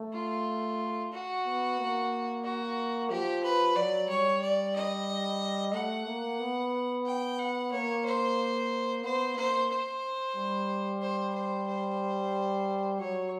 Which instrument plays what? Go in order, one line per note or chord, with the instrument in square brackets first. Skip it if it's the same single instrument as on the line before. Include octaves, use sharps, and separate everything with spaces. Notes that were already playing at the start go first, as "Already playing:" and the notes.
Already playing: [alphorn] A3
[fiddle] F4
F#4
[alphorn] B3
A#3
[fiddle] F#4
[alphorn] F3 [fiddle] G4
[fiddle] B4
[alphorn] F#3 [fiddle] D5
[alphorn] G3 [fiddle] C#5
[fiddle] D5
D#5
[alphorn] A3 [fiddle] F#5
[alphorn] A#3
B3
[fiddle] G5
F#5
[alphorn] A#3 [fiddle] C#5
[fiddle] C5
[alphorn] B3 [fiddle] C5
[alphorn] A#3 [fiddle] C5
[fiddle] C5
[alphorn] G3
[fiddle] C5
C5
C5
[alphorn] F#3 [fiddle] C#5